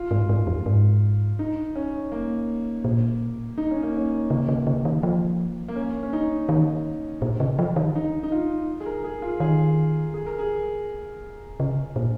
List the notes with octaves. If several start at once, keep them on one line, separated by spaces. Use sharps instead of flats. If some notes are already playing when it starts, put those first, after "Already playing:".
Already playing: F4
G#2
G#2
F2
G#2
D#4
C#4
A#3
A#2
D#4
C#4
A#3
C#4
C#3 A#3
C#3
C#3
D#3
F3
A#3
C#4
C#4
D#4
D#3
A#2
C#3
F3
D#3
D#4
D#4
F4
G#4
A#4
G#4
F4
D#3 G#4
G#4
A#4
G#4
C#3
A#2